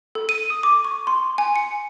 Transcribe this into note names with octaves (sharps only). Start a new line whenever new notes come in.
A4
D#7
D#6
D6
C#6
C6
G#5
C#7